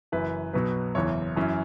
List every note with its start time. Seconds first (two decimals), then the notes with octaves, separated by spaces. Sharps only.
0.12 F#1 F#2 E3 B4
0.53 B1 B2 F#3 B3 B4
0.95 F#1 E2 E3 C#5
1.36 F#2 E3 C#4